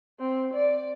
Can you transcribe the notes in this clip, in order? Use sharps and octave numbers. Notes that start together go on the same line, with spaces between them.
C4
D5